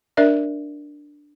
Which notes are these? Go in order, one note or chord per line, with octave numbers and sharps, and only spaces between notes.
D4 A#4 D5 E5